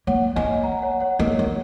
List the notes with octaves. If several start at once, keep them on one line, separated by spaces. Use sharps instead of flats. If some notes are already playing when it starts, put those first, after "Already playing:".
A#3 C#5 F#5
A#3 D#5 G#5
F#5 A#5
C#5 F#5
C#5 F#5
A#3 A#4 D#5
A#3 C#5